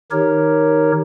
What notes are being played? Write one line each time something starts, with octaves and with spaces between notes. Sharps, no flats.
D#3 D#4 G4 A#4 C#5